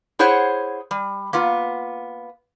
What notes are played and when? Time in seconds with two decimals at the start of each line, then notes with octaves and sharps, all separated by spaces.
0.19 E4 G#4 C5 C#5 F#5
0.91 G3
1.33 A#3 B3 F4